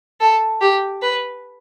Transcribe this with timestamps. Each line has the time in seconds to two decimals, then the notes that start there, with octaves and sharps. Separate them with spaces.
0.21 A4
0.61 G4
1.01 B4